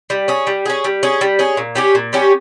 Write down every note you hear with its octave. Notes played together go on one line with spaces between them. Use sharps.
G3
C#4 G#4
G3
C#4 G#4
G3
C#4 G#4
G3
C#4 G#4
A#2
G3 C#4 G4
A#2
G3 C#4 G4